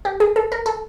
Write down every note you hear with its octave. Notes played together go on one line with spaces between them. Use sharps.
G4
G#4
A4
A#4
A4